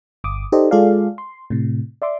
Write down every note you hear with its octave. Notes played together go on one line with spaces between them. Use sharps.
G1 D6 D#6
D#4 G4 A4 C5 D5 D#5
G#3 F4 G#4 A4 D5 F5
C6
A2 C3
D5 E5 C6 D6